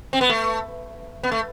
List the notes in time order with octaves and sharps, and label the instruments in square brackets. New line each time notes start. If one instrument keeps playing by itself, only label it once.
[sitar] C4
B3
A3
B3
A3